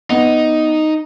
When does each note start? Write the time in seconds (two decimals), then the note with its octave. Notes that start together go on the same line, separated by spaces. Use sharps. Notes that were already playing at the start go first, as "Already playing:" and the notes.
0.10 B3 D#4